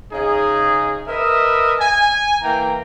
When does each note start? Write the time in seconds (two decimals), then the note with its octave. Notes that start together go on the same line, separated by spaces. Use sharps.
0.12 C#3 D#4 G#4
1.07 A#4 B4 D#5 E5
1.79 G#5
2.42 E3 A#3 G5 A#5